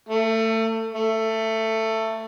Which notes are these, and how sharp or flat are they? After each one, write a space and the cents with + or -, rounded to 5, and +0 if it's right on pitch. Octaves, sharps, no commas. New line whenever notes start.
A3 +25
A3 +15